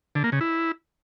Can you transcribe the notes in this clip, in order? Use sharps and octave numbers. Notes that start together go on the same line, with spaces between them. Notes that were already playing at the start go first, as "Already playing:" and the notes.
D3
A#3
C#3
E4